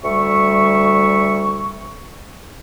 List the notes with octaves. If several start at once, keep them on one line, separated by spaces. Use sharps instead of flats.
D2 G3 E5 C#6